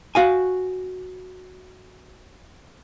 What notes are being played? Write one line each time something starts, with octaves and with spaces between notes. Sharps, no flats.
F#4 F5 G#5